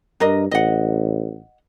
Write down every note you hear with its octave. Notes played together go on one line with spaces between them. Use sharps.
G2 D4 A#4 D#5
A1 D#5 F#5